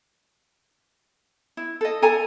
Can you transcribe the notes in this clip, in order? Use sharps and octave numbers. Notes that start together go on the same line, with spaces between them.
E4
A4 D#5
A4 G#5 A#5